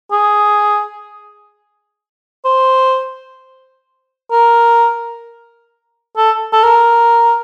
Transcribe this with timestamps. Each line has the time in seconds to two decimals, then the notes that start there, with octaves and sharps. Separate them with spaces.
0.12 G#4
2.45 C5
4.32 A#4
6.17 A4
6.53 A4
6.64 A#4